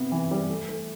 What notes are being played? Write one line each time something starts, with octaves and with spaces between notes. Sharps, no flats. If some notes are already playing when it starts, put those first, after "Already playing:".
Already playing: C3 B3
E3
G3
A3
A3